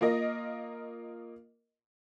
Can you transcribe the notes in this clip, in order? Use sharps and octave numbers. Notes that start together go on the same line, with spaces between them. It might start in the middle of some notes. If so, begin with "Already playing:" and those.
A#3 F4 A#4 D#5